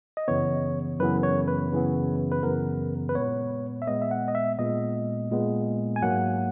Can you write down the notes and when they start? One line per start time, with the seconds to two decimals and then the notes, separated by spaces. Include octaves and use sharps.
0.17 D#5
0.28 F#2 C#3 E3 B3 C#5
0.99 F#2 C#3 E3 B3 B4
1.23 C#5
1.48 B4
1.72 F#2 C#3 E3 B3
2.32 B4
2.43 F#2 C#3 E3 B3 A#4
3.09 B4
3.15 A#2 G#3 B3 C#5
3.82 E5
3.87 A#2 G#3 B3 D#5
4.02 E5
4.11 F#5
4.28 D#5
4.35 E5
4.59 A#2 G#3 B3 D#5
5.31 A#2 G#3 B3
5.96 G#5
6.02 G#2 F#3 A#3 F#5